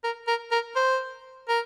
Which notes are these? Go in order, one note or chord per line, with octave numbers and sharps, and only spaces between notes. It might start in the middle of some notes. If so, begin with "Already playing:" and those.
A#4
A#4
A#4
C5
A#4